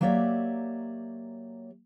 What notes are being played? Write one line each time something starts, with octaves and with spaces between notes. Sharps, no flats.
F#3 A#3 G4 C#5 D5 E5